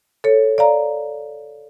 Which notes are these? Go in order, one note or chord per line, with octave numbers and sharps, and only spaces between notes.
A4 C#5
D5 F5 A#5